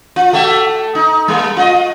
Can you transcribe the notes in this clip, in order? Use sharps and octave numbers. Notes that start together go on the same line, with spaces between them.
F4
A3 F#4 E5
D#4
G3 A#3
F4 D#5